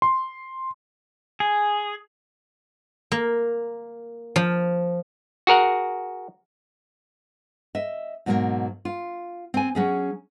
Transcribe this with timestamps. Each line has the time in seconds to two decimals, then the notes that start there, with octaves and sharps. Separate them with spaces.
0.02 C6
1.40 G#4
3.12 A#3
4.36 F3
5.47 F#4 G#4 A#4 F#5
7.75 D#5 E5
8.26 G#2 B2 F#3 G#3 A#3
8.85 F4
9.54 C4 G#5
9.75 F#3 C#4 G#4